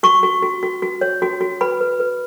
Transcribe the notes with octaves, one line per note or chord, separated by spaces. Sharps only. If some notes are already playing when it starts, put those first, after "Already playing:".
F#4 C#6
F#4
F#4
F#4
F#4
C#5
F#4
F#4
B4 B5
B4
B4